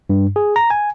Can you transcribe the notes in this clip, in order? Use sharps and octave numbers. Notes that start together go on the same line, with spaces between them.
G2
G#4
A#5
G#5